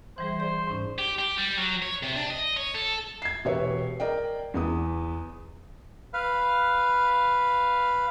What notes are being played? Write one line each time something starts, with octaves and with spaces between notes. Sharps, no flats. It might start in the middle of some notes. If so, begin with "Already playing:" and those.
E3 G3 G#4 C5
G#4 C5 D5
G#2 C#4 D#4
G4
G4
G3
F#3
C#5
C3
D4
D#5
C#5
A4
G#6 C7
E1 F#4 G4 B4 C#5 E5
A#4 D5 D#5 G5
E2 B3 D#6
B4 F5